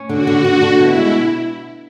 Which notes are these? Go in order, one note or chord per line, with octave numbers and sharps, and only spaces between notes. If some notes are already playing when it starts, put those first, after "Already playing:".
Already playing: C#4
D3 F#4
D3
D3
D3
B2 E4
G#3